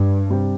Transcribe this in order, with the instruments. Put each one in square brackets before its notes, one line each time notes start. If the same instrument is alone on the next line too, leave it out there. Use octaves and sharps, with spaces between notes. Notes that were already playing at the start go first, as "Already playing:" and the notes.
Already playing: [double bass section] G2
[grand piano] C3 G3 C4 G4